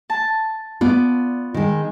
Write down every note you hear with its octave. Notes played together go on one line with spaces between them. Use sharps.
A5
B3 F4 D5
D#3 G#3